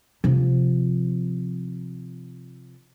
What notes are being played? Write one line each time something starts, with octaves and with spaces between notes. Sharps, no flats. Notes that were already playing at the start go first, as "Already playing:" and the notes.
C3 F3